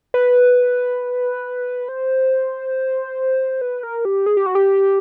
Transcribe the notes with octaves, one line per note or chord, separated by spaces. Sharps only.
B4
C5
B4
A#4
G4
G#4
G4
F#4
G4